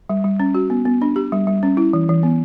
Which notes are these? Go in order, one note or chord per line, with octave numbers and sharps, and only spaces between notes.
G3
G3
C#4
F#4
B3
B3
D4
G4
G3
G3
C#4
E4
E3
E3
B3